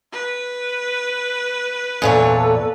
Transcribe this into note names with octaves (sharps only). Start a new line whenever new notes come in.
B4
E2 A#2 A4 C#5